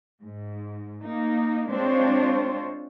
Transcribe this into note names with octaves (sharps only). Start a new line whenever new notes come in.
G#2
A#3 D#4
G#3 C4 D4 F4 C5 C#5